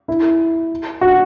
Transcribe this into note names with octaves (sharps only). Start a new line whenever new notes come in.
E4
F#4